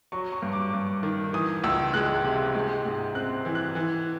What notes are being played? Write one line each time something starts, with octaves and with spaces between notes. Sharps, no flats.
F#3 C#6
C#6
G2
D6
G2
D#3
E3 D#6
C#2 E6
G#3 F#6
C3
G#3
G#2
C4 F#6
E3
F#6
E3